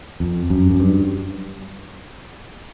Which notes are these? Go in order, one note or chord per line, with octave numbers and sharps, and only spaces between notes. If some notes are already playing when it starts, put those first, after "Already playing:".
F2
F#2
F#2
G2